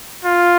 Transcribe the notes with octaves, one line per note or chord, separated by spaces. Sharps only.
F4